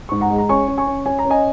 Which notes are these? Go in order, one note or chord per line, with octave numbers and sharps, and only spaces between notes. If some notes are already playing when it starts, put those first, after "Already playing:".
G#2 C#6
F#5 A#5
G#3
A#5
C#4 G#5 C#6
C#4
G#5 C#6
C#4
C#4 G#5
A#5
C#4
D#5 G#5